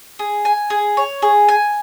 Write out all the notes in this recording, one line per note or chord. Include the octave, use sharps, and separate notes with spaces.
G#4
G#5
G#4
C#5
G#4
G#5